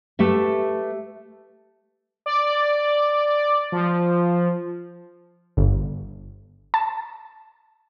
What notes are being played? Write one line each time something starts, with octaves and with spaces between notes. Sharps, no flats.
A3 G4 B4 E5
D5
F3
G1
A5